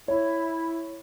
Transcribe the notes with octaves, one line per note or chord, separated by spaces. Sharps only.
E4 C#5